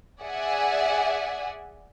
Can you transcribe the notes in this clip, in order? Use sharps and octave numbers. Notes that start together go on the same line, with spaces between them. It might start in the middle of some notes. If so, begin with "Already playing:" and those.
G#4 D5 E5 F#5 G#5